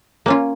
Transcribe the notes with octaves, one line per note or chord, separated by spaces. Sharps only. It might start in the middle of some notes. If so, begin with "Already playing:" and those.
A#3 C#4 F4